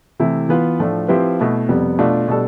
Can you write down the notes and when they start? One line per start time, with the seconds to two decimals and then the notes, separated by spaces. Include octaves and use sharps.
0.20 C3 E3 A3 E4
0.49 E3 B3 F4 B4
0.79 A2 F3 A3 D4
1.08 F3 C4 E4 G4 B4
1.39 B2 A3 E4
1.69 F2 C3 G3 B3
1.99 B2 A3 D4 F4
2.28 B2 G3 D4 A4